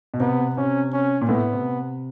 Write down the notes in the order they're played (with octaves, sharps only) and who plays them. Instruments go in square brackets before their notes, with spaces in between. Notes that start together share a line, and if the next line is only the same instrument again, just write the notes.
[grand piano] B2
[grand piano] C3 [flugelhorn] B3
[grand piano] C3 [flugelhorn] C#4
[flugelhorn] C#4
[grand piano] A#2
[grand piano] A2 [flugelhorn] B3
[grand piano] C3